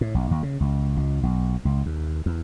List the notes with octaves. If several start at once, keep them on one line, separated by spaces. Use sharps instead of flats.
A2
B1
D#2
C#3
C#2
C#2
B1
C#2
D#2
E2